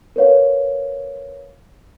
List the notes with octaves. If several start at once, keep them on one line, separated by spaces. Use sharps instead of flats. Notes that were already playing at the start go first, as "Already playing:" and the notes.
A#4 B4 C#5 F5